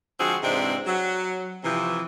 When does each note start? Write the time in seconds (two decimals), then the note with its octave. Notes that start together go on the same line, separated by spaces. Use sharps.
0.19 D3 F3 G#3 C4 F#4 G#4
0.42 G#2 C3 E3 G#3 C4 D4
0.86 F#3
1.64 C3 E3 F3